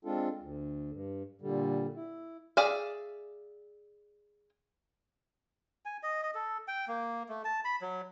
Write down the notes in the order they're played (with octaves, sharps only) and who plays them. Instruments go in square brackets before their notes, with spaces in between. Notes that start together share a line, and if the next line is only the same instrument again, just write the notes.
[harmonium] G#3 C4 D4 F4 A4
D2
G2
A#2 D3 G3
E4
[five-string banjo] G#4 D5 E5 F5
[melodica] G#5
D#5
D#5
A4
G5
A#3
A3
A5
B5
F#3